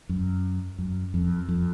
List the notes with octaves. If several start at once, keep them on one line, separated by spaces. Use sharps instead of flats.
F#2
F#2
F2
F2